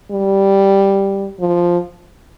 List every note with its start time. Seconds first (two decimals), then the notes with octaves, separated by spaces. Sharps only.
0.11 G3
1.40 F3